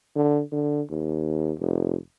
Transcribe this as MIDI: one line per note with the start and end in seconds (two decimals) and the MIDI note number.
0.16 0.41 50
0.52 0.81 50
0.90 1.53 39
1.59 1.96 29